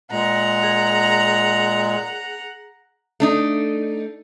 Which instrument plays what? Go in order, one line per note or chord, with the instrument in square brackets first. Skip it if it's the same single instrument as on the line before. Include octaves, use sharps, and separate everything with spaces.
[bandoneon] A#2 G#3 [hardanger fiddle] F#5 A#5
[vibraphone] G#4
[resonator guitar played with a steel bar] A3 D4 D#4